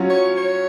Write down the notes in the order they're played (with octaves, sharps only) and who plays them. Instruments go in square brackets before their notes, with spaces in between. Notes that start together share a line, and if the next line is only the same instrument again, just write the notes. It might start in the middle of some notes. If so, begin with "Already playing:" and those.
Already playing: [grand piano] F#3 C#4 F4
[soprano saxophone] C#5
C#5